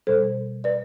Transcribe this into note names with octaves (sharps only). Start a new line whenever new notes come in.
B2 G3 A4 C5
B4 D5